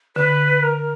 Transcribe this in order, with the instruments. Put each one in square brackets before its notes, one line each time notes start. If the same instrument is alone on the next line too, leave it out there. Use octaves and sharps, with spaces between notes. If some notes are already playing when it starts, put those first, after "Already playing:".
[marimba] D3 [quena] B4
[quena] A#4